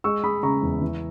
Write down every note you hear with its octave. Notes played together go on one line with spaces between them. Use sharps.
G#3 C#6 E6
G#3 B5 D#6
C#3 A#5 C#6
E2
E3